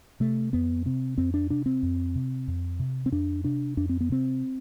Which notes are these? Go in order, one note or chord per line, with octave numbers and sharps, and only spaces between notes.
C3 A3
F2 B3
C3 C4
F2 C4
D4
C3 D4
C4
F2
C3
F2
C3
C4
F2 D4
C3 D4
F2 D4
C4
B3
C3 C4